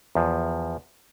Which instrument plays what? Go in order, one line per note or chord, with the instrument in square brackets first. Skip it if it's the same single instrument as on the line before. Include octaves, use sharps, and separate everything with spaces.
[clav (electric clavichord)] E2 F3